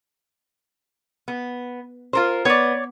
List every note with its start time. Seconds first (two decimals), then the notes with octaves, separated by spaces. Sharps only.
1.28 B3
2.13 F4 A#4 C5
2.45 B3 C#5 D5